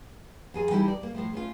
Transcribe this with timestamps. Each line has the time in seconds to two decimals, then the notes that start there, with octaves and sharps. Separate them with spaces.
0.54 F2 G#4 G#5
0.70 E3 G3 D#4 E4 G4 A4
0.88 D5
1.03 A#3
1.15 A2 F3 A3
1.33 A3 C#4 F4